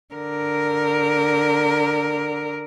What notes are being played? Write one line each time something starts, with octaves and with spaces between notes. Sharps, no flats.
D3 A#4